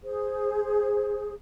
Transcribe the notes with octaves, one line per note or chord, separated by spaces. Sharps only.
G#4 C5